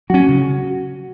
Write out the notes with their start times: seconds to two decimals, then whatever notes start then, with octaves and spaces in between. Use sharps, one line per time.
0.10 F#3 C#4 F#4
0.28 C#3